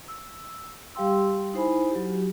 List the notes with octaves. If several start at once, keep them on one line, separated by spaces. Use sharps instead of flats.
E6
G3 G4 F5 G5 C6 E6
D#4 E4 C5 G#5 B5
F#3 F#4 G4